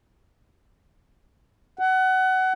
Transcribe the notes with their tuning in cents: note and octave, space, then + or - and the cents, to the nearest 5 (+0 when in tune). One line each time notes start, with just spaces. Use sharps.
F#5 +25